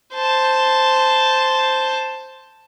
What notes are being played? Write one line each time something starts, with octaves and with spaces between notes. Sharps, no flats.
C5 A5